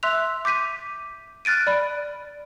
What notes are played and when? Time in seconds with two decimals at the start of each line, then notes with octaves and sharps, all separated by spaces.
0.03 E5 C6 E6 F#6 B6 F7
0.45 D6 G6 B6 D#7
1.45 F6 F#6 A6 D7 D#7
1.67 D5 B5